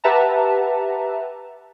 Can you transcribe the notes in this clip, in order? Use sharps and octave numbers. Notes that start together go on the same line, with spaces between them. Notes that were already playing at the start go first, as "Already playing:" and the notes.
G4 B4 E5 F#5 A5 A#5